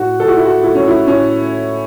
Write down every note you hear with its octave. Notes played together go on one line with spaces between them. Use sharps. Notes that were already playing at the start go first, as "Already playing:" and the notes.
Already playing: A2 F#4
A2 A4
F#4
E4
F#4
A3 E4
C#4
E4
A2 C#4